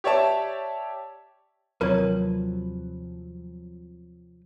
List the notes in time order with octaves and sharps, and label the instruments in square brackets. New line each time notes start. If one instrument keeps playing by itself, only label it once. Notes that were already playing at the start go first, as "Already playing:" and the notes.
[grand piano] G4 C#5 D5 E5 A5
[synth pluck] D#2 C3 F#3 [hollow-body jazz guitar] F3 B4 [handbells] A#4 C#5